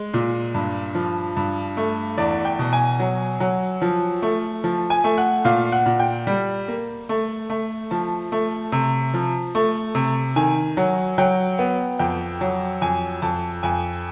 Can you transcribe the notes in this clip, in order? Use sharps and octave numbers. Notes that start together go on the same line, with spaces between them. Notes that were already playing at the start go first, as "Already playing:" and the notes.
Already playing: G#3
A#2
G2
F3
G2
A3
E2 D5
G5
B2
G#5
F#3
F#3
F3
A3
F3
G#5
A3
F#5
A#2 F5
F#5
A#2
G5
G3
A#3
A3
A3
F3 A5
A3
C3
F3
A3
C3
D#3 G#5
F#3
F#3 G5
B3
F2 G5
F#3
F2 G#5
F2 A5
F2 G#5